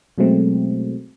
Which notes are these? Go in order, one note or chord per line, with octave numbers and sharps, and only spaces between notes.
B2 F#3 G#3 A3 C4